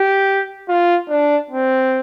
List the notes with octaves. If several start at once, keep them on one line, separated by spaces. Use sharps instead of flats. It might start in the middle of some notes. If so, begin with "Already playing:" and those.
Already playing: G4
F4
D4
C4